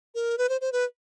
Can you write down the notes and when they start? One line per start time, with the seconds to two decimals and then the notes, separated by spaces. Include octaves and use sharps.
0.15 A#4
0.38 B4
0.49 C5
0.61 C5
0.72 B4